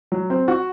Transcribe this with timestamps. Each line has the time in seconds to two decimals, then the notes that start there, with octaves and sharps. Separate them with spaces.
0.12 F#3
0.30 C4
0.48 F#4